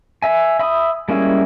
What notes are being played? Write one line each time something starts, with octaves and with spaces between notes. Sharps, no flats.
E5 G#5
E5 B5 D#6
G3 G#3 A#3 C#4 E4